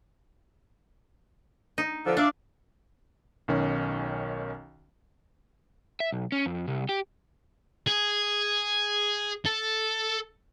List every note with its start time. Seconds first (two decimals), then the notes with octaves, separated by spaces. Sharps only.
1.78 D#4
2.05 D3 F3
2.17 D4 D5 E5 F5
3.48 B1 D#3 C#4
6.00 E5
6.12 B1
6.32 C#4
6.46 F2
6.68 C2
6.89 G4
7.87 G#4
9.46 A4